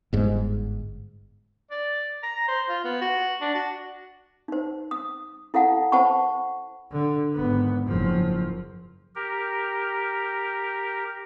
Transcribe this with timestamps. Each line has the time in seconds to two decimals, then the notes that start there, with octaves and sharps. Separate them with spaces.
0.13 G1 G#2
1.71 D5
2.23 A#5
2.48 C5
2.69 F4
2.85 B3
3.02 F#4
3.41 D4
3.54 F#4
4.48 D#4 C5
4.91 D#6
5.54 E4 A4 F5 F#5 A5
5.92 C5 F#5 A5 B5 C#6
6.91 D3
7.34 G#1 B3
7.87 F#1 F3
9.15 G4 A#4